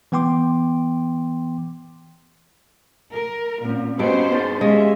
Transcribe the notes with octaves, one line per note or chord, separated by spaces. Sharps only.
E3 B3 G5 C6 D6
A#4
A#2 C4 C#4
G2 B3 C#4 F#4 C5 D#5 D7
D#4 G#4 A6
G#3 C#4 G4 E5 F5